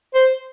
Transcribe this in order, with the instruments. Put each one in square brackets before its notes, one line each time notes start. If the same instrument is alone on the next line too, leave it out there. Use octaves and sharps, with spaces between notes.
[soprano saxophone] C5